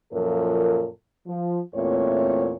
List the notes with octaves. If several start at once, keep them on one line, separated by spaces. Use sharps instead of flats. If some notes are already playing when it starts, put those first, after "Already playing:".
F#2 A#2 F3 A4 A#4
F3
E2 A#2 A3 C4 C#5